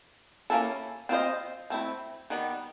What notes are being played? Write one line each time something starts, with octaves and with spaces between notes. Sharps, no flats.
A#3 C#4 E4 A4
C4 F4 G#4 C5 D#5
A3 C4 E4
D#3 G3 B3